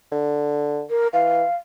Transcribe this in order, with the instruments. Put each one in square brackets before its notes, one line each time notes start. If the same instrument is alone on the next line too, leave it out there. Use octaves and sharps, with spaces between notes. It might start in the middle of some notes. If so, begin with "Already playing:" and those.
[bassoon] D3
[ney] A#4
[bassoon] E3 [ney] F5